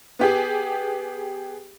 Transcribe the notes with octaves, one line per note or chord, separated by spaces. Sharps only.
B3 G4 G#4